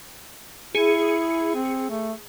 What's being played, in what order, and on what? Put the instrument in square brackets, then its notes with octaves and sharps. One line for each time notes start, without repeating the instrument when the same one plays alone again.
[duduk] E4 [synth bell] G#4 C#7
[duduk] C4
A3